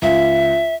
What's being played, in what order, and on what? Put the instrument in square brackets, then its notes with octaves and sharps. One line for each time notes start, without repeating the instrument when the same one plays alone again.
[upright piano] C#2 [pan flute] E5